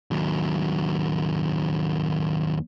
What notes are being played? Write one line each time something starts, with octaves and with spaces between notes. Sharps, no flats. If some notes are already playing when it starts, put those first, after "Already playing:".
D#2 F#3